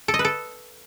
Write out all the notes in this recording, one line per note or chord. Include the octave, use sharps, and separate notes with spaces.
A4
D#5
B4
A4